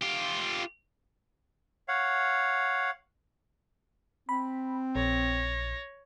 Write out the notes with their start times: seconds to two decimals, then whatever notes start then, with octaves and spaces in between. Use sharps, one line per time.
0.01 F4 G4
1.88 C#5 F5 F#5
4.29 C4 B5
4.96 A#1 C#5 A#6